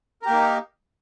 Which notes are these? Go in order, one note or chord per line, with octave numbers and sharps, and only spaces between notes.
A#3 D#4 G4 A#4